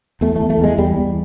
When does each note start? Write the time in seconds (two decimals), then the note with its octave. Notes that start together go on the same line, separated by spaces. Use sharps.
0.21 E2 A3
0.36 A3
0.41 E2
0.50 A3
0.59 E2 G#3
0.78 E2 G3
0.96 E2